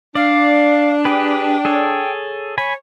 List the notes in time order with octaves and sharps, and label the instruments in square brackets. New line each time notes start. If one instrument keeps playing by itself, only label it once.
[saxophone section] D4 [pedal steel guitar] D5 [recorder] F5
[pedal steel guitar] G4 G#4 B4 [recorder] G5
[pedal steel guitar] G#4 A4 C#5
[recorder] C#5 [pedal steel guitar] G#5 B5